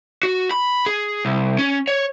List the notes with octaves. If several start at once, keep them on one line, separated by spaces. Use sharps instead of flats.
F#4
B5
G#4
C2
C#4
C#5